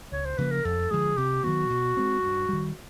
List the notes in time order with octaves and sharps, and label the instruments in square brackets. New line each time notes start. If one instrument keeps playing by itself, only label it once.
[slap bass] C#2 [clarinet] C#5
[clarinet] C5
[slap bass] C#3 F3 A#3 [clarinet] B4
[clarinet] A#4
[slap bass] F2 [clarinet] A4
[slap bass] D3 F3 G#3 [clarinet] G#4
[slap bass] C3 [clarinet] G4
[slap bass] D#3 F#3 B3 [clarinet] F#4
[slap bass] B2
G#3 C4
G2
D#3 G3